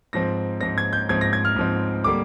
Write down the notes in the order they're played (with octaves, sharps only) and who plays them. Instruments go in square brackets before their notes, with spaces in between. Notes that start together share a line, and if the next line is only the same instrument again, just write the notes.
[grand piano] G#2 F3 C4 A#6
G#2 F3 C4 A#6
G#6
G6
G#2 F3 C4 G#6
A#6
G#6
F6
G#2 F3 C4
D3 G3 A#3 D6